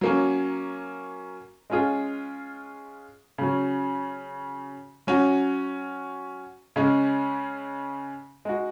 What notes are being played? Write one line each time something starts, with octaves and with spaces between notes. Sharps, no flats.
F#3 A#3 C#4
G#3 C#4 F4 G#4
C#3 F#3 C#4
F#3 C#4 F#4
C#3 G#3 C#4
G#3 D#4 F#4